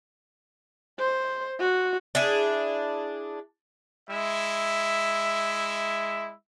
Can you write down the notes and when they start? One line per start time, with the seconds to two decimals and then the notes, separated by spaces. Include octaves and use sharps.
0.99 C5
1.60 F#4
2.15 D4 E4 G#4
4.10 G#3 E4 E5